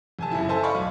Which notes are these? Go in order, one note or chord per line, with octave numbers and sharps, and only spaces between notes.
F1 G#5 A5
F#1 E4
A4 C5 E5 G#5 A5
D5 D#5 F5 B5 C#6 D6
B1